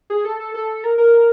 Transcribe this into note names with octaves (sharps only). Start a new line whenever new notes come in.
G#4
A4
A4
A4
A#4
A#4